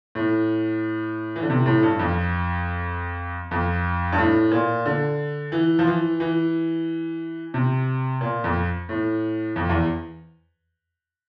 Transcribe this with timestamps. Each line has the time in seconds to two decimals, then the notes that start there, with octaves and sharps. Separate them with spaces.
0.15 A2
1.36 E3
1.42 D3
1.50 C3
1.66 A2
1.83 G2
1.99 F2
3.51 F2
4.12 G2
4.18 A2
4.51 A#2
4.85 D3
5.52 E3
5.79 F3
5.87 E3
6.20 E3
7.54 C3
8.21 A#2
8.44 F2
8.89 A2
9.56 F2
9.69 E2